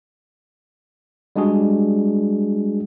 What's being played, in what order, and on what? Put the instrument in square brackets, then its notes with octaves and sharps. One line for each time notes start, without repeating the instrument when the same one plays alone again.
[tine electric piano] G3 G#3 D4 F#4 G#4